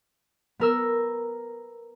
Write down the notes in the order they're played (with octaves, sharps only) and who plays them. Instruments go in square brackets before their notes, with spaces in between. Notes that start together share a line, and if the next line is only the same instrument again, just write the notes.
[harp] B3 A#4 E6